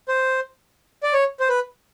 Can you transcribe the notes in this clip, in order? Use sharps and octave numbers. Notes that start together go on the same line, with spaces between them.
C5
D5
C#5
C5
B4